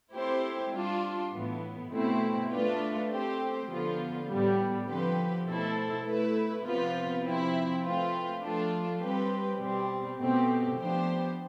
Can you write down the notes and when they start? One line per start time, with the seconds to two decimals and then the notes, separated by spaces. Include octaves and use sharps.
0.14 A3 C4 E4 G4 C5
0.72 G3 D4 F4
1.32 A2 E3 B3
1.90 B2 A3 C4 E4
2.50 A3 D4 F4 B4
3.09 A3 C4 G4 C5
3.68 D3 F3 B3 F4
4.27 A2 G3 B3
4.86 D3 F3 C4 G4 B4
5.46 B2 A3 E4 A4 C5
6.04 A3 E4 B4
6.63 C3 F3 B3 F4 B4
7.23 C3 F3 C4 E4
7.82 A3 C4 F4 B4
8.41 F3 A3 D4 F4
9.00 G3 C4 G4 B4
9.59 B2 G3 C4 G4
10.18 B2 A3 C4 G4
10.77 F3 B3 D4 G4 C5